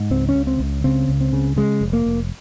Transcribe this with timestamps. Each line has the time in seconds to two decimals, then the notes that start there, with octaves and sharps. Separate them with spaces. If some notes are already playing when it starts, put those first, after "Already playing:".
Already playing: G#2
0.10 C#2 C4
0.29 C#4
0.35 C#3
0.47 C4
0.60 C#2
0.84 C#3 C4
1.09 C#2
1.20 C4
1.33 C#3
1.56 C#3 G#3
1.81 F1
1.93 A#3
2.06 F1